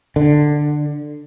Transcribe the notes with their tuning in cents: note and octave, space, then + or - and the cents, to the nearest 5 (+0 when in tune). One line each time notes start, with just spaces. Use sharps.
D3 +15